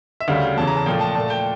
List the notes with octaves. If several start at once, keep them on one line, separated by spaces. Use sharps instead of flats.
E5
D2 C#3 G3 F5
E2 C#3 E3 A5
A#5
A5
A#2 F3 A3 G5
A5
A#2 A3 A5
G5